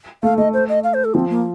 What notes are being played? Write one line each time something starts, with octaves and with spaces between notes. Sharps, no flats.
A3 F5
A3 D#5
C5
D#5
F5
C5
A4
F3 C4
A#3